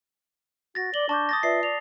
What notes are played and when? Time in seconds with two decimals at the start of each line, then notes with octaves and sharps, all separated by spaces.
0.75 F#4 A6 A#6
0.94 D5 F#7 G7
1.09 D4 A5 C#6 D6 G6
1.29 D#6 A6 A#6
1.43 F4 B4 D5 E5 C7
1.63 D5 F7